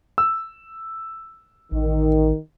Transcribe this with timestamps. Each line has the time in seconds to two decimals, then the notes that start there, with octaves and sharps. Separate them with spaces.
0.18 E6
1.72 A1 D#3